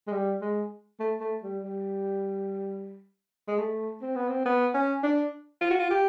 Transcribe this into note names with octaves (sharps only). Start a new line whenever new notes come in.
G#3
G3
G#3
A3
A3
G3
G3
G#3
A3
C4
B3
C4
B3
C#4
D4
F4
F#4
F4
G4